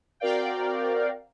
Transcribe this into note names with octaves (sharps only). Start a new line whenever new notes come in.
C4 F#4 A#4 D5 F5 G5